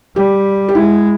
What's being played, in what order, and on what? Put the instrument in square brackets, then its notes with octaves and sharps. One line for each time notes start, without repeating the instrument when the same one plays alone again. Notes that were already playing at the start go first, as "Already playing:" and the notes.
[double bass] G3 [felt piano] G4
[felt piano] G4
[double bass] G#3 [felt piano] E4